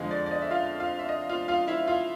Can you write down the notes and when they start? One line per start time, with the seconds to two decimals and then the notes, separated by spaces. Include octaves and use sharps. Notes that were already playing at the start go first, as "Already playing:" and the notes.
Already playing: F2 D3 F3 G#3 D#5
0.11 D5
0.26 D5
0.31 D#5
0.42 E5
0.50 F4 F5
0.80 F4 F5
0.99 E5
1.09 D#5
1.29 F4 F5
1.48 F4 F5
1.68 E4 E5
1.87 F4 F5